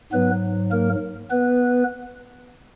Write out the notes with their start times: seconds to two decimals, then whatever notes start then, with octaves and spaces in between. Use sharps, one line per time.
0.12 G#2 F#3 B3 B4
0.71 A#3 A#4
1.30 B3 B4